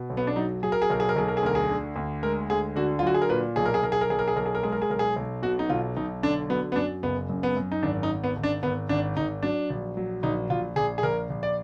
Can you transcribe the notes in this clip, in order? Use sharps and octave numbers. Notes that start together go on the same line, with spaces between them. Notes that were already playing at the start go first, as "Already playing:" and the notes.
Already playing: B2
B1
B3
D4
F#3 D#4
F#3 G#4
A#4
G#4
B1 A#4
G#4
A#4
B1 G#4
A#4
G#4
D2 A#4
G#4
D3
D2
G#3 A#4
D2 G#4
D3 F#4
F4
F#3 F#4
G#4
A#4
A#2 B4
B1 G#4
A#4
G#4
B1 A#4
G#4
A#4
B1 G#4
A#4
G#4
B1 A#4
G#4
A#4
G#3 G#4
A#4
G#4
B1 A#4
G#4
B1
B2 F#4
D#4
B1 F4
B1 D#4
D3 D4
F#3 B3
B3
F#2 D4
F#1 B3
F#2
B3
F#2
D#4
G#1 D4
D#4
G#1
B3
G#1
D4
G#1 B3
G#1 D4
G#1 D#4
F#3 D4
A#1
F#3
A#1 D#4
A#1 F4
A#1 G#4
G#4
A#1 A#4
A#1
D5